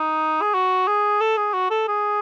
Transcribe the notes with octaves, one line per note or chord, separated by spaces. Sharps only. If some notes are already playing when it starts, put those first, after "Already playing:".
Already playing: D#4
G#4
F#4
G#4
A4
G#4
F#4
A4
G#4